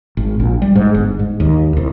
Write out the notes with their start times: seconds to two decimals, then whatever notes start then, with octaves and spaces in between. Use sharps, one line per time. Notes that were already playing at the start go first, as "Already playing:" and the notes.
0.17 G#1
0.40 A#1
0.62 G3
0.75 G#2
0.94 G1
1.19 G#2
1.40 D#2
1.77 C2